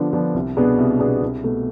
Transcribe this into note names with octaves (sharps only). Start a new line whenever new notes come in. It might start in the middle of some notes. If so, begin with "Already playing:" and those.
Already playing: D3 F3 B3 D4
F3 B3 D4
C2
B2 B3 D4 G#4
C2
B2 B3 D4 G#4
C2
B2 A3